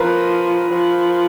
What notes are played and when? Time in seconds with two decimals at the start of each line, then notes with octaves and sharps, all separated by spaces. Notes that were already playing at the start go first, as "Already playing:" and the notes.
Already playing: F3 A#4 B4
0.71 F3